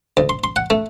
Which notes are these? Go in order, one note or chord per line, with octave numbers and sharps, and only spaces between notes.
D2
C6
C6
F#5
A3